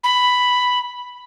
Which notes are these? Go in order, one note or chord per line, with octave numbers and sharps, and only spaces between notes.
B5